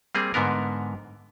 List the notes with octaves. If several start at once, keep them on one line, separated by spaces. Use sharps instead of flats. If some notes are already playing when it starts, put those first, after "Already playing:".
G3 A#3 C4 G#4
G#2 D3 B3 A#4